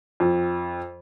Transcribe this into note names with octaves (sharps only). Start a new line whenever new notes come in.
F2